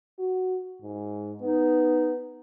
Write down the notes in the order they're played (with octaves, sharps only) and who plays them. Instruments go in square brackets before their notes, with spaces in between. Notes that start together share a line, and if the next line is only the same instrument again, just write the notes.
[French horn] F#4
G#2
[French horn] B3 [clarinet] D#4